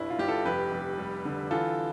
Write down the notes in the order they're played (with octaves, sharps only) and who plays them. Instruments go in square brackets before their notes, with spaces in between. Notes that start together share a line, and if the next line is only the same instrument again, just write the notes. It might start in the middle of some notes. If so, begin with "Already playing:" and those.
Already playing: [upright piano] G1 C2 E4
F4
G1 G4
F4 A4
F1 G4 B4
F1
G3
D3
E3 F4 A4